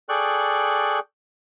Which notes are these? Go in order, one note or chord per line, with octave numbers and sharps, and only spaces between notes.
G#4 A4 D5 G5 C#6 F#6